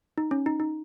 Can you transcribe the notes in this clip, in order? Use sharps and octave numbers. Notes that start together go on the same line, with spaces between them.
D#4
C#4
D#4
D#4